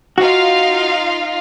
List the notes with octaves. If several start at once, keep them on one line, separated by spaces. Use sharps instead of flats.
D#4 F4 F#4 F5